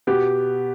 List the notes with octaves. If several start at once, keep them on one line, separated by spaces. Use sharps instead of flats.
B2 B3 G4